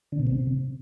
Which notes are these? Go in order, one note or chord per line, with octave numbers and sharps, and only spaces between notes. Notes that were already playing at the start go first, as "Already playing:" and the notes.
D3
B2
C3